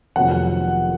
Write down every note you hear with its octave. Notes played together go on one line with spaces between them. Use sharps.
F1 F2 D#3 F#3 B3 F#5